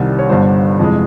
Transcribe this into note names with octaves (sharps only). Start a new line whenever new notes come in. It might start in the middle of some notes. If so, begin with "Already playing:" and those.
Already playing: C2 C3 D#3 G3
C#5
G1 G2 D3 G3 C5
F2 C3 E3 G#3